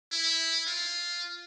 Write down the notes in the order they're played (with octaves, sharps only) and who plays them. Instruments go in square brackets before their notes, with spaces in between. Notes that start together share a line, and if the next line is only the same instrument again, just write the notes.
[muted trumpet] E4
F4